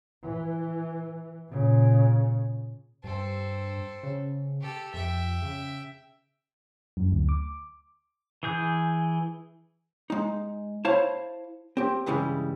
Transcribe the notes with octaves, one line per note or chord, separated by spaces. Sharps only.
E3
A#2 C#3
G2 C4 A4
C#3
G4 A4
F2 E5 G5
C#3
F#2
D2
D6
E3 G#4 G6
G#3 D#4
E4 C5 C#5 F5 A5
C4 G4
G2 C#3 E3 G3 G#3